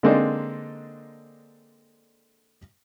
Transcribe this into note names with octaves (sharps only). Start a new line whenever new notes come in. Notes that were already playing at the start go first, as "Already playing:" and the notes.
D3 G#3 A#3 C4 D4 D#4